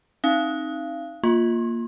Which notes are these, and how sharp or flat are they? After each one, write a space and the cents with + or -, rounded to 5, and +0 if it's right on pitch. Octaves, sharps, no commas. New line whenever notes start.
C4 +30 D#4 +0 F5 -30
A#3 +0 F4 +5 C6 +35